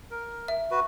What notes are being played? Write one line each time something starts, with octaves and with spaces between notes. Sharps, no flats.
A#4
E5
F#4 B4